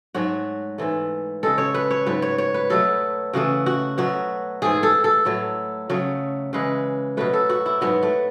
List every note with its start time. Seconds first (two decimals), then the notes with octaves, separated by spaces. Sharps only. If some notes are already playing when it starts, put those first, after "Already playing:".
0.15 G#2 F#3 A3 F#4
0.78 G#2 E3 A3
1.43 C#3 G#3 A4
1.58 C#5
1.74 B4
1.91 C#5
2.06 G#2 F#3 A3 B4
2.22 C#5
2.38 C#5
2.54 B4
2.70 B2 F#3 A3 A4
3.33 C#3 E3 A3 F#4
3.66 F#4
3.98 B2 F#3 A3 F#4
4.62 G#2 E3 A3 G#4
4.83 A4
5.04 A4
5.25 A2 F#3 A3
5.90 C#3 F#3 A3
6.53 C#3 E3 G#3 B4
7.17 B2 F#3 A3 B4
7.33 A4
7.49 F#4
7.66 E4
7.81 G#2 F#3 A3 B3
8.03 A3